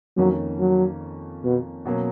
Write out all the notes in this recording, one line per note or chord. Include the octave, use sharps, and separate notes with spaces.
F2 D#3 F#3 A#3 C#4
F#3
B2
B2 F#3 A#3 C#4